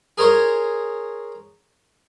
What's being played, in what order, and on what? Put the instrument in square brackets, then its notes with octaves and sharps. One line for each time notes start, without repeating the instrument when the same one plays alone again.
[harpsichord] G#4 A#4 C5 C#5